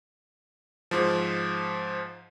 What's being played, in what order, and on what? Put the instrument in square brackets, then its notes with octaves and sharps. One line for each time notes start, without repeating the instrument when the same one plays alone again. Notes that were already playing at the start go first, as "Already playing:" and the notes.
[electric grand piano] G#2 F3